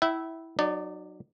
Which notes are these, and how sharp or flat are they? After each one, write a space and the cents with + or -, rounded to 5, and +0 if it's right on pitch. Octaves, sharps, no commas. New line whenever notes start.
E4 -10 E5 +0 G5 -45
F#3 +0 D#4 -40 D5 +0